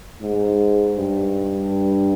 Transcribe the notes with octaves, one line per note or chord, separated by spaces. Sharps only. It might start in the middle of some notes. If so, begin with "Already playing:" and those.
G#2
G2